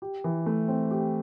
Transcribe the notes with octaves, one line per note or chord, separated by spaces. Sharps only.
G4
E3
A3
C4
G4